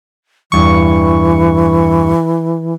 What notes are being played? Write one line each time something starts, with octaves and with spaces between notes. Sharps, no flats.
E2 G2 E3 C#6